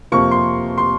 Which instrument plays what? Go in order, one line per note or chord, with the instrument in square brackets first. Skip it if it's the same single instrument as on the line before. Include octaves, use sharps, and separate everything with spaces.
[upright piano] F2 C3 F3 A#3 C#6
C6
C6